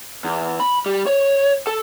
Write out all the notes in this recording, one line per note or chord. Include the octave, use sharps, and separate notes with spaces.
E2
B5
G3
C#5
A4